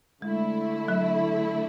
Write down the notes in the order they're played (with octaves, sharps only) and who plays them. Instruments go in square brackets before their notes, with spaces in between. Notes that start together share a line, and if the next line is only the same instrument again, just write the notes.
[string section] D3 A3 E4 [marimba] G#3
[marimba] F#3